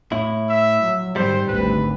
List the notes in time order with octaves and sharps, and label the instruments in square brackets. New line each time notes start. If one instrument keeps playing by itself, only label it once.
[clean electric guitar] A2 E4
[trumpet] E5
[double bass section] F#3
[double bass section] G#2 D#3 [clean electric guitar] G3 C4 [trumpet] C5
[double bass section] G#1 D2 [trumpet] B4